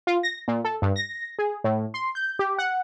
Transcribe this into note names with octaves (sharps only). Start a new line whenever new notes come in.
F4
A#6
A#2
A4
G2
A#6
G#4
A2
C6
G6
G4
F#5